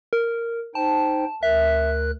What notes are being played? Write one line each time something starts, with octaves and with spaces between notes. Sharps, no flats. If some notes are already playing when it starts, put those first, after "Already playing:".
A#4
D#4 C5 G5 A5
D2 A#4 E5 F#6